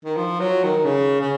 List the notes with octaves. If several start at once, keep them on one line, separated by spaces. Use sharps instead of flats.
D#3
F3
F#3
D#3
C#3
C#3